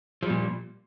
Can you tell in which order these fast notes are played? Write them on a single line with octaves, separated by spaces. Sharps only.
F3 G3 A#2